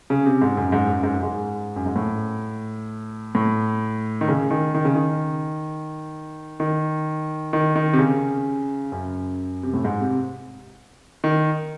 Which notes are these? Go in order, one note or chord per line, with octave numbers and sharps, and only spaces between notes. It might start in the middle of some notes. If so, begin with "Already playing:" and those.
C#3
C3
G#2
F#2
G#2
F#2
G#2
F#2
G#2
F#2
G#2
A2
A2
D#3
C#3
D#3
D#3
C#3
D#3
D#3
D#3
D#3
C3
C#3
F#2
C3
A2
G#2
C3
D#3